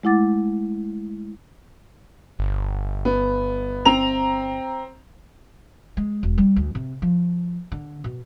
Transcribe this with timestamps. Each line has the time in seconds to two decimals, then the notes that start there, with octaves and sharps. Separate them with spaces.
0.03 G#3 A3 E4 F#5 D6 A6
2.39 G1
3.05 B3
3.85 C4 A#5 F7
5.97 G#3
6.23 E1
6.38 G3
6.56 D2
6.75 C3
7.02 F3
7.72 D3
8.04 B2